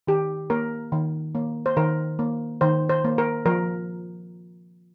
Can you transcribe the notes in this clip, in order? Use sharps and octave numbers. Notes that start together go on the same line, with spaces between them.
D#3 G4
A#3 A#4
D#3
A#3
C5
D#3 A#4
A#3
D#3 C5
C5
A#3
A#4
F3 A#4